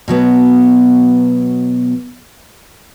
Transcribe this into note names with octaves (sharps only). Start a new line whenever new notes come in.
B2 F#3 B3